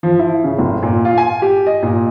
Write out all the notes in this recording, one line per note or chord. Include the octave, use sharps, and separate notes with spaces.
F3
E4
C#3
F1
A#2
F4
G#5
G4
D#5
A#2